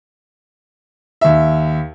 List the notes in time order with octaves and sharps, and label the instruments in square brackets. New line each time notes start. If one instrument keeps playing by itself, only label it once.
[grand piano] D#2 E5